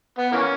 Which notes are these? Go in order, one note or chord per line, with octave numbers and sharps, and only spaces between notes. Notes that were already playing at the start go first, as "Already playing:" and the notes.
B3
E3 A#3 C#4